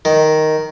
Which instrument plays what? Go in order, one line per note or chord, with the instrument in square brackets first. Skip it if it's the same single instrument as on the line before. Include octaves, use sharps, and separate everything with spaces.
[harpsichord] D#3